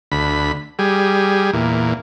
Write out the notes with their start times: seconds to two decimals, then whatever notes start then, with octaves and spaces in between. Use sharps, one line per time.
0.12 D2 B5
0.79 G3 G#4
1.53 E2 A#2